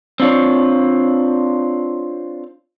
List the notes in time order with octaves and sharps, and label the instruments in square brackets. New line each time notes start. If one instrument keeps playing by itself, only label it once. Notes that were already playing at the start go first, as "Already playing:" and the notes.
[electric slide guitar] C4 D4 F4 C#5